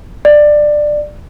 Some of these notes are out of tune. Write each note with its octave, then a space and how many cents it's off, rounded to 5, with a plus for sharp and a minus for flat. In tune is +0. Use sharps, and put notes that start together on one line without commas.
D5 +15